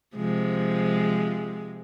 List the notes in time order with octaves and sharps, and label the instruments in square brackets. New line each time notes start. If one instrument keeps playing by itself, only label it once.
[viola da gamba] C3 F3 G#3